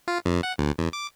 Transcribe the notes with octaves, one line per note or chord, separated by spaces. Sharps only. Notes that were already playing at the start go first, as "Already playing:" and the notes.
F4
F2
F#5
D2
E2
D6